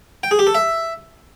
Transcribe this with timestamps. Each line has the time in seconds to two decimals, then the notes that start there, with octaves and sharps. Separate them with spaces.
0.23 G5
0.31 G#4
0.39 G4
0.47 A4
0.55 E5